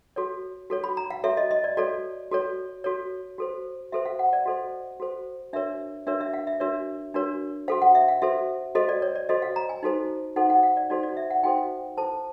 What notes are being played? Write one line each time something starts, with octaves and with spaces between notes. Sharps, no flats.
F#4 A4 C#5
F#4 A4 C#5
B5
A#5
F5
F#4 A4 C#5 E5
D#5
D#5
D5
F#4 A4 C#5 D5
F#4 A4 C#5
F#4 A4 C#5
F#4 A4 C5
F#4 A4 C5 E5
F5
F#5
D5
F#4 A4 C5 D#5
F#4 A4 C5
D4 F#4 A#4 C#5 E5
D4 F#4 A#4 C#5 E5
E5
F5
E5
D4 F#4 A#4 C#5 E5
D4 F#4 A#4 C#5
F#4 A4 C5 F5
F#5
E5
F5
F#4 A4 C5 E5
F#4 A4 C5 D#5
D5
C#5
D5
F#4 A4 C5 D#5
F5
A#5
G#5
D#4 F#4 A4 C5
D#4 F#4 A4 C5 F#5
F#5
F5
D5
D#4 F#4 A4 C5 D5
D5
E5
F#5
D#4 F#4 A4 C5 G5
E4 A4 C5 A5